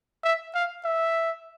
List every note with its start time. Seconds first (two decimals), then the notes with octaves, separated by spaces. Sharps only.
0.24 E5
0.55 F5
0.85 E5